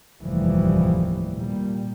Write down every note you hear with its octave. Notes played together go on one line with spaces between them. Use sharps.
F1 D#2 A2 E3 F3 G3
A#2 G3